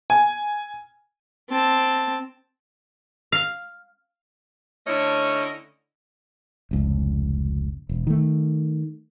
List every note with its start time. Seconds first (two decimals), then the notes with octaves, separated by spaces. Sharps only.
0.10 G#5
1.49 C4 A5
3.32 F5
4.87 D3 A3 C#4 E4 C#5 D#5
6.71 F1 C#2
7.89 E1
8.07 D#3 A3